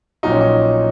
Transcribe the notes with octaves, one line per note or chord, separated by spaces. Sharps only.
A#1 A#2 F#3 D#4
C#4
D#4